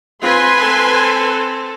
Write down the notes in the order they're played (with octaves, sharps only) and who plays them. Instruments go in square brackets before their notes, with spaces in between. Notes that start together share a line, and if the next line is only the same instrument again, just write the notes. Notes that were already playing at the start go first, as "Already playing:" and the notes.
[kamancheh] C4 F4 [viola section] B4 G#5 C6
[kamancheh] C4 A4